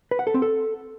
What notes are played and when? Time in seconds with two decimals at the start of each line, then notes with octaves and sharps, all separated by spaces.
0.11 B4
0.19 F#5
0.27 A4
0.34 C4
0.42 A4